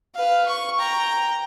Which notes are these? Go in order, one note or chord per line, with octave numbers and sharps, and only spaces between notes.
B4 F5
C#6
G5 A#5